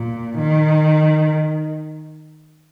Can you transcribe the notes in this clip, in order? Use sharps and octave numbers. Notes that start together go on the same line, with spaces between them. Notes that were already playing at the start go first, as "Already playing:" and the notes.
Already playing: A#2
D#3